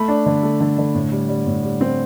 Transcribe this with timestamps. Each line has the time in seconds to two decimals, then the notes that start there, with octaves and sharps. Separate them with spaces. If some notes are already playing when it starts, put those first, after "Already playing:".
Already playing: A3 B5
0.08 D4
0.26 D3
0.43 A3
0.60 D3
0.78 D3
0.95 A2
1.12 G3
1.29 G3
1.46 A2
1.64 G3
1.81 C4